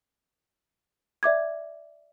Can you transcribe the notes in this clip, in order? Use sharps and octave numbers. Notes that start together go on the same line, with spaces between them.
D5 E5 D6 G#6